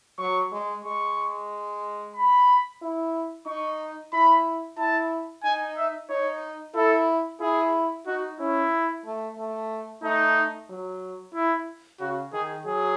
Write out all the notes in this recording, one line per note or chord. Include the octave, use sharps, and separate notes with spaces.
F#3 C#6
G#3
G#3 C#6
B5
E4
D#4 C#6
E4 B5
E4 A5
D#4 G#5
E5
D#4 C#5
E4 A4
E4 G#4
D#4 F#4
C#4 E4
A3
A3
A3 D#4
F#3
E4
C#3 F#4
D#3 G#4
F#3 G#4